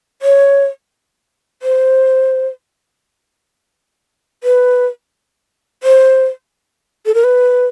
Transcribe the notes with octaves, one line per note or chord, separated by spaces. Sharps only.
C#5
C5
B4
C5
A4
A#4
B4